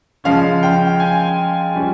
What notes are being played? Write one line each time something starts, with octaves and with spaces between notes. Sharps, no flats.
C#3 F3 G#3 C#4 F5
G5
G#5
G3 C#4 F4